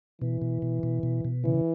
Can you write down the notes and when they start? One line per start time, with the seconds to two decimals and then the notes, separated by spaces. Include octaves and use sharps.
0.21 B2 E3
0.42 B2
0.62 B2
0.83 B2
1.03 B2
1.25 B2
1.45 C#3 E3